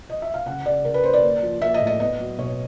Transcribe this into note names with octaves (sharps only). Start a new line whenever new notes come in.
D#5
E5
F5
C#3 F#5
C#3 D5
C#3 A#4
B4
C#3 C5
D5
A#3
F3
A#3 E5
D#5
A2
D#5
B3 D#5
F#3
B2 C#5